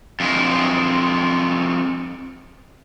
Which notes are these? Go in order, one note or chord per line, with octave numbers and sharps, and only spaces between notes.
F2 G#3